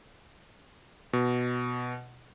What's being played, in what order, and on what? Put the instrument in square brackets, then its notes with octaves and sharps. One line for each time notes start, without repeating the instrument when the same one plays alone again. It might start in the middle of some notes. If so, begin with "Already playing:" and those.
[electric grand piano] B2